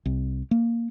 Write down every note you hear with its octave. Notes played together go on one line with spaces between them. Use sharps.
C2
A#3